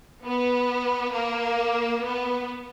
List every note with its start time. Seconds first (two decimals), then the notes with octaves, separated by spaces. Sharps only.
0.24 B3
1.13 A#3
2.02 B3